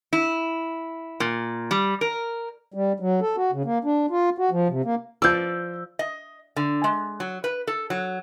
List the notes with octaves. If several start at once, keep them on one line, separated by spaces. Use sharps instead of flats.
E4
A#2
G3
A#4
G3
F#3
A4
F#4
C#3
A#3
D4
F4
F#4
F3
C3
A#3
F3 D5 E6 G6
D#5
D3
G#3
F#3
B4
A4
F#3